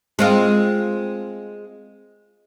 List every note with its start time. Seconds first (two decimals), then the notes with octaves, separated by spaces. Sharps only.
0.19 G#3 C4 F4